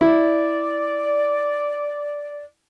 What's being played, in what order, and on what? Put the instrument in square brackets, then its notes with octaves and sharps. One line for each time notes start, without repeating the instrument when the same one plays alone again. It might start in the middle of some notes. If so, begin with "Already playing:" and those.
[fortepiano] E4 [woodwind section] D5